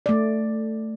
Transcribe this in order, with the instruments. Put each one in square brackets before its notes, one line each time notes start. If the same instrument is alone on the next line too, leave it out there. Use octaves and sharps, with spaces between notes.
[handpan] A3 D5